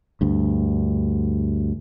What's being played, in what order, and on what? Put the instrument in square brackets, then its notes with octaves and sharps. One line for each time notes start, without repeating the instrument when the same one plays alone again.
[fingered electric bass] D2 G2